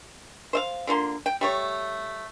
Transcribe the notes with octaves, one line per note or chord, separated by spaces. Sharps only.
C5 E5 F5
D3 F3 A#3 C6
G5
G3 A3 C#5